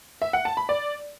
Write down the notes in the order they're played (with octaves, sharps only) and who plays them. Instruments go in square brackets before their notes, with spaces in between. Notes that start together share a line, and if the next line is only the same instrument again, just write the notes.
[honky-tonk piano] E5
F#5
A5
B5
D5